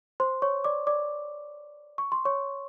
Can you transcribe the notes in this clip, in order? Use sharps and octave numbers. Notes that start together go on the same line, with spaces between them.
C5 C6
C#5 C#6
D5 D6
D5 D6
C#6
C6
C#5 C#6